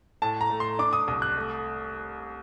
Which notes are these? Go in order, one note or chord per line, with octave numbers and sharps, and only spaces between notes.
A2 A5
A#5
A3
C6
D4 D6
D#6
C2 D#6
F#6
A3